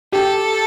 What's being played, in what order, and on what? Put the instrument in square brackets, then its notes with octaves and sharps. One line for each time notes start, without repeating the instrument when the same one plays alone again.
[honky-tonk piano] G4 [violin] A4